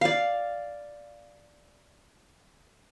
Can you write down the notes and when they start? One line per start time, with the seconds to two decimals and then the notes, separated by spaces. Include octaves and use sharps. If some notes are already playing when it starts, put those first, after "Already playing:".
0.01 D5 F5